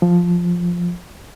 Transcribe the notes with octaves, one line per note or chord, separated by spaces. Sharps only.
F3